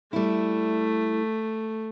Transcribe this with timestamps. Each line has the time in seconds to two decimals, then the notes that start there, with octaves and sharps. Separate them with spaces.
0.13 G3 A3 E4